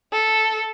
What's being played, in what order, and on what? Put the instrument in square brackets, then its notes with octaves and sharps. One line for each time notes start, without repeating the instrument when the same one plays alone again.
[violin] A4